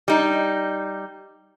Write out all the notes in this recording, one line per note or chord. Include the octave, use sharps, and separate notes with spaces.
G3 D#4